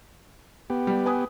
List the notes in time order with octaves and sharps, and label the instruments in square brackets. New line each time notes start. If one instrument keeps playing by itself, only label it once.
[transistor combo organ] B3 G4
[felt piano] G3
B4 G#5 D#6